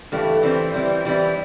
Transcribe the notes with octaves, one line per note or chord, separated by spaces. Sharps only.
G2 E3 A3 E4 G4
E3 G3 C4 E4
E3 G3 C4 E4
E3 G3 C4 E4